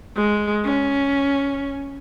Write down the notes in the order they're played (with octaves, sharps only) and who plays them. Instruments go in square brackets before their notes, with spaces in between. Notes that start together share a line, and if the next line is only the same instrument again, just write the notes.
[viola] G#3
C#4